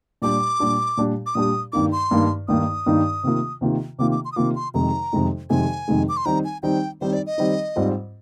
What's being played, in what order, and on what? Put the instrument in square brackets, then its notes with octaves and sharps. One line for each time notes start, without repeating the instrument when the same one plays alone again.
[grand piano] A#2 G3 D4 G4 [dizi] D6
[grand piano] A#2 G3 D4 G4
A#2 G3 D4 G4
[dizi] D6
[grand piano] A#2 G3 D4 G4 [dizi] D#6
[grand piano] G2 D#3 A#3 D#4 [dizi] D6
[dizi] C6
[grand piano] G2 D#3 A#3 D#4
[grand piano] G2 D#3 A#3 D#4 [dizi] D#6
[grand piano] G2 D#3 A#3 D#4
C3 D#3 A#3 F4
C3 D#3 A#3 F4
[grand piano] C3 D#3 A#3 F4 [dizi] D6
[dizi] D6
C6
D#6
[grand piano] C3 D#3 A#3 F4 [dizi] D6
[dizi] C6
[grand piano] F2 C3 D#3 G#3 D#4 [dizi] A#5
[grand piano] F2 C3 D#3 G#3 D#4
[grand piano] F2 C3 D#3 G#3 D#4 [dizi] G#5
[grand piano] F2 C3 D#3 G#3 D#4
[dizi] D6
C6
[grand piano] D#3 G3 C4 D#4 [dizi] A#5
[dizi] G#5
[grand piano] D#3 G3 C4 D#4 [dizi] G5
[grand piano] D#3 G3 C4 D#4 [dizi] C5
[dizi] D5
D#5
[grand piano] D#3 G3 C4 D#4
G#2 G3 C4 F4